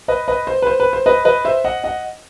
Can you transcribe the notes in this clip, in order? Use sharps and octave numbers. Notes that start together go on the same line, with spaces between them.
B4 D#5
B4 D#5
C5
B4
C5
B4
C5
B4 D#5
B4 D#5
C5 E5
D#5 F#5
D#5 F#5